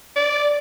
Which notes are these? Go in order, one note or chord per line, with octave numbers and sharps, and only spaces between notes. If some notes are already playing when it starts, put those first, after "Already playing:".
D5